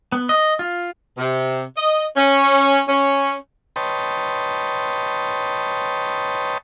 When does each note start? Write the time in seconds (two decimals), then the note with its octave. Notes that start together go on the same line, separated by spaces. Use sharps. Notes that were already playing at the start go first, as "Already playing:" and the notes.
0.12 B3
0.29 D#5
0.59 F4
1.18 C3
1.76 D#5
2.17 C#4
2.89 C#4
3.76 B4 C#5 D#5 G5 A5 C6